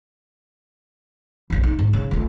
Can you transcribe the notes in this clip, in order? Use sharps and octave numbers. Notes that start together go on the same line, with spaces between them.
F1 A#1
D#4
G#2
C#3
C#2 A3